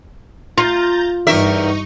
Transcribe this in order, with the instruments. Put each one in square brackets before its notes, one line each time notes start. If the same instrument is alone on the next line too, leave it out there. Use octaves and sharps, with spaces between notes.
[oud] F4 [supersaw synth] A#5 G6 A6
[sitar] E2 A#4 E5 [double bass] G2 [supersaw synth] D#4 C#6